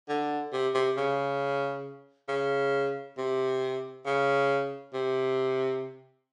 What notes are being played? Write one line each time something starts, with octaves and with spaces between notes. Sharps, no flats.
D3
C3
C3
C#3
C#3
C3
C#3
C3